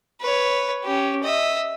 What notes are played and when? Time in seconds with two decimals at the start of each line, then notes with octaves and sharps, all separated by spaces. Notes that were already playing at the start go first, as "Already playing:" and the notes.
0.21 B4 C#5
0.84 C#4 G4
1.23 D#5 E5